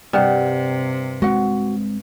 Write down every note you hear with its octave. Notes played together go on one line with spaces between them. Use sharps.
G2 C3 G4 F#5
G#3 C4 F#4 F#5